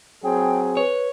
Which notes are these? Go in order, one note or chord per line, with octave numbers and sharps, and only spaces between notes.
F#3 C4 G#4 G5
B4 C#5